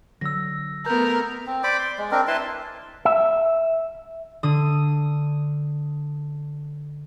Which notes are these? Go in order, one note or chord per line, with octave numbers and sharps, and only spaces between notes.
D3 F#3 E6 A#6
A3 B3 A#4 G6
C4
C5 D5 B5 D6
C6
G#3
C4 D4 A#4
E4 B4 A5 C6
E5
D3 D#6